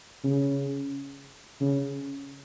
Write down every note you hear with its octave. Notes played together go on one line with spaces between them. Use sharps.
C#3
C#3